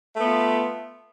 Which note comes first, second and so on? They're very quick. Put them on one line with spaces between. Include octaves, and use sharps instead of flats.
A3 B3 F4